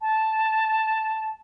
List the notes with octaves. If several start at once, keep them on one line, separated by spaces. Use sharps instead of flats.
A5